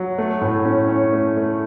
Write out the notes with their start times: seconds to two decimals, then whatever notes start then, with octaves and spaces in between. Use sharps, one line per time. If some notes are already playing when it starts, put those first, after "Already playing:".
Already playing: F#3
0.18 A3
0.41 A2
0.65 C#4
0.89 C#4 C#5
1.13 A3
1.37 A3